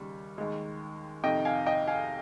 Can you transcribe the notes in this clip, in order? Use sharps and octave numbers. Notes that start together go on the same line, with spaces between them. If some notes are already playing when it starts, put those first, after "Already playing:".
Already playing: D#2 C#3 G3
D#2 D#3 G#3
F2 C3 D#3 D#5 G5
F5 G#5
D#5 G5
F5 G#5